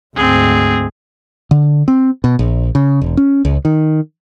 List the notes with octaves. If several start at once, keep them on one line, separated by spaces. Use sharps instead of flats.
D2 G#2 C4 G#4
D3
C4
B2
A#1
C#3
E1
C#4
C#2
D#3